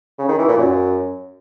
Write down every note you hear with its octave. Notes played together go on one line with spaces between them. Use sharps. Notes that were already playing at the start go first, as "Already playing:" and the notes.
C#3
D#3
E3
A#2
F#2